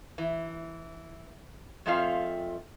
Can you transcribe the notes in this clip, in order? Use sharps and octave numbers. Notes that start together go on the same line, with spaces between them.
E3
F2 G#3 A3 C4 F4 F5